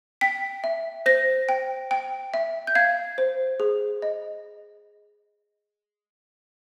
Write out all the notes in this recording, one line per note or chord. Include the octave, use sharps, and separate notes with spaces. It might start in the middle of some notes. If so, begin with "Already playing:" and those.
G5 B6
E5
C5 A#6
G5
G5
E5
G6
F5 G#6
C5
G#4
D#5